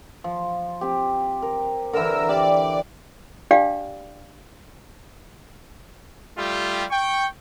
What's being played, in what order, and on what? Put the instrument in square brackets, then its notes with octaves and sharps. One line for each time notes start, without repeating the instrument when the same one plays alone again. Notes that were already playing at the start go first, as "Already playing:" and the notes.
[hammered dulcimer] F3
C4 G4
A#4
[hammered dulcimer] D3 E3 [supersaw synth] A#4 E6
[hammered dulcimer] G4 [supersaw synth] D5
[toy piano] D4 G4 D5 F5 G5 D6
[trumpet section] G3 A3 F4 G4
G5 C#6